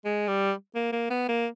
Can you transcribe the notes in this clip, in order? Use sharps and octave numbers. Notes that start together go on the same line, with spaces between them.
G#3
G3
A#3
A#3
B3
A#3